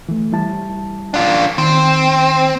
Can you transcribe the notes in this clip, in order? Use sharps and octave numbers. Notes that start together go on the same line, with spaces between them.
E3 A3
G3 E4 A5
D4 F4
D#3 C4